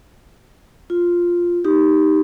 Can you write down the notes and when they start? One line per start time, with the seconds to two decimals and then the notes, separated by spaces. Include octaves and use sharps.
0.90 F4
1.64 D#4 G4